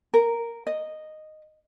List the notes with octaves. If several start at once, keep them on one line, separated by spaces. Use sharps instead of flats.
A#4
D#5